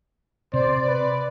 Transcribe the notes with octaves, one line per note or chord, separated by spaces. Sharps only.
C3 C5 D5
B4